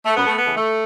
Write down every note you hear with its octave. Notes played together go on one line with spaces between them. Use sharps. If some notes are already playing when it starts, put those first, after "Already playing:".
A3
F#2 B3
A3
B3
C#3 E3 A3
A3